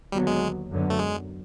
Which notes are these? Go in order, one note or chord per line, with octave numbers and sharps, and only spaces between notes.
D#2 D3 F#3 G3 B3
G#3
F#2 D3 F#3 B3
A3
G#3